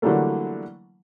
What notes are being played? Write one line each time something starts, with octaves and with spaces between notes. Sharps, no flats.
D3 E3 F#3 G3 A3 A#3